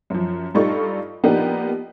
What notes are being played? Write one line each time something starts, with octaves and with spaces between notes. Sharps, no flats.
F#2 F3
G2 G3 D#4 F4 A4 C#6
F3 A#3 B3 D4 D#4 G4